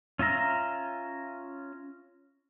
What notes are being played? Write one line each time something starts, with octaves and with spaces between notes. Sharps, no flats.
C#4 F4 E5 A#5